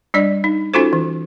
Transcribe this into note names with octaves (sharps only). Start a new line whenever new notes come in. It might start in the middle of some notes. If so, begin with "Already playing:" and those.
G3 D4 D5
D#4
C#4 D#4 F4 F#4 A4 C5
E3